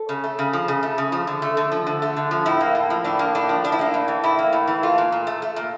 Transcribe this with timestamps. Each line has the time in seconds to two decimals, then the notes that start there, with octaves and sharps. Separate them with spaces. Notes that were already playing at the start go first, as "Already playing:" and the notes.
Already playing: A4
0.09 C#3
0.24 A3
0.39 C#3
0.53 F3
0.68 C#3
0.83 A3
0.98 C#3
1.12 F3
1.27 D3
1.42 A3
1.57 D3
1.72 F3
1.87 D3
2.02 A3
2.17 D3
2.31 F3
2.46 A2 E4
2.60 A#3
2.75 A2
2.90 F3
3.04 A2 D4
3.19 A#3
3.35 A2 D4
3.49 F3
3.64 A2 D4
3.72 E4
3.79 A#3 D4
3.94 A2
4.08 E3
4.23 A2 E4
4.39 A#3
4.53 A2
4.68 E3
4.83 A3 F4
4.98 A#2
5.12 A#2
5.27 A3
5.42 A3
5.56 A#2